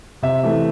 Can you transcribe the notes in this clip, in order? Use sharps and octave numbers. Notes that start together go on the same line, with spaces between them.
C3 E5
E3 A3